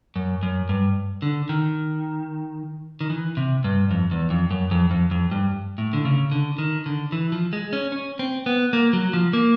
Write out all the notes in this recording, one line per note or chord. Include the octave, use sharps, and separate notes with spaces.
F#2
F#2
G2
D3
D#3
D#3
E3
C3
G2
F2
E2
F2
F#2
F2
F2
F2
G2
A2
D3
C#3
D3
D#3
D3
E3
F3
G#3
C#4
C#4
C4
B3
A#3
F#3
F3
A#3